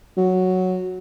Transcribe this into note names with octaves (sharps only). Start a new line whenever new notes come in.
F#3